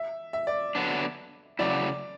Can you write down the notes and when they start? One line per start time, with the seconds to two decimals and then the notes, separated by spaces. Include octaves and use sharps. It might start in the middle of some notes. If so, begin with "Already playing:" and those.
Already playing: E5
0.33 E5
0.47 D5
0.75 D3 F#3 B3 D4
1.59 C#3 F#3 A3 E4 D5